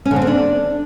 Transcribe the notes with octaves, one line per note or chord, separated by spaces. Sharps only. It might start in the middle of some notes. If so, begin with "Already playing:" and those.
C#4
D3
C4
D3
D4